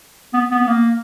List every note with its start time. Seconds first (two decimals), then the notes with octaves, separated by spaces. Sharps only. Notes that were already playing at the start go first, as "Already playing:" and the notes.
0.33 B3
0.51 B3
0.61 B3
0.67 A#3